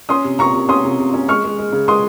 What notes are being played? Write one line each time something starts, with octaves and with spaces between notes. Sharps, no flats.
C#4 C6 D#6
C3
C3 A#5 C#6
C3
C#4 C6 D#6
C3
C3
C#4
G#3 C#6 F6
G#3
G#3
C#3
G#3 C6 D#6